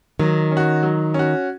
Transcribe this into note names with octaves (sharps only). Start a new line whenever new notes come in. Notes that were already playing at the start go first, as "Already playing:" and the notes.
D#3 F#3
C#4
F#4
F#3
C#4 F#4